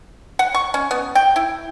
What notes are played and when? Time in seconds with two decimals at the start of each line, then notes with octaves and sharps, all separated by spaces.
0.39 F#5
0.54 C#6
0.74 C#4
0.91 B3
1.15 G5
1.36 E4